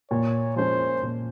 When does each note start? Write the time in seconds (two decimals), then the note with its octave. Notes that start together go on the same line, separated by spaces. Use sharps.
0.10 A#2 C#5
0.56 F3 G#3 C#4 C5
1.03 A#2